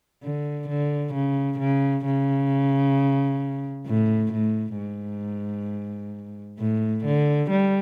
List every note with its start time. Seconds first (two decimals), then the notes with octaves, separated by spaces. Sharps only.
0.23 D3
0.68 D3
1.14 C#3
1.59 C#3
2.05 C#3
3.86 A2
4.32 A2
4.77 G#2
6.59 A2
7.05 D3
7.50 G3